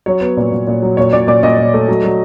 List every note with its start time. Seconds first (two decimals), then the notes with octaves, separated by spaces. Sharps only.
0.06 F#3 C#5
0.21 B3
0.37 A#2
0.52 A#2
0.67 A#2
0.82 F#3
0.97 A#2 C#5
1.13 A#2 D5
1.27 A#2 D5
1.43 A#2 D#5
1.58 A#2
1.74 A3
1.88 F#3
2.04 F#3